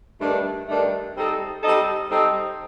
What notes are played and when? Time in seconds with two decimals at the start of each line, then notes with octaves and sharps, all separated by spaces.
0.21 G2 D#3 A3 D4
0.68 G2 D#3 A3 D4
1.16 G3 C4 D#4 A4 D#5
1.63 G3 C4 D#4 A4 D#5
2.10 G3 C4 D#4 A4 D#5